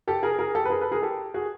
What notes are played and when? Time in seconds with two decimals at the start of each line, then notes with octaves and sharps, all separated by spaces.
0.08 G4 A4
0.23 G#4 A#4
0.38 G#4 A#4
0.55 G4 A4
0.65 B4
0.70 G#4 A#4
0.81 A4 B4
0.92 G#4 A#4
1.02 G4 A4
1.34 F#4 G#4